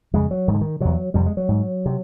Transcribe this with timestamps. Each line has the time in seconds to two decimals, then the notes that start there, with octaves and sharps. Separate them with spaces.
0.13 F2 C#3 G#3
0.31 F#3
0.48 G#2 D#3
0.54 D3
0.61 D#3
0.80 E2 C3 F#3
1.14 F2 C3 G3
1.26 G#3
1.37 F#3
1.49 G#2
1.86 C3